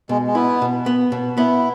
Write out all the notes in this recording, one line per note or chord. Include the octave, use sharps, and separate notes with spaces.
B2 G#3
G#3
B3 E4
B2
B3
B2
B3 E4